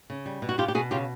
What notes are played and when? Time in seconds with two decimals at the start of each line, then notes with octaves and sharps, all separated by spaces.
0.10 C#3
0.26 G3
0.42 B2
0.49 F#4
0.58 B2 F4 G4
0.68 G4
0.75 B2 F#4 G#4
0.91 C#3 F4 G4